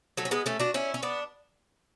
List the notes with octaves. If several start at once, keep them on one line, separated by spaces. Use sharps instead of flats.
F#3 A3
C#4
G#3 B3
A3 C#4
D4 F#4
C#4 E4
C#4
B3 D4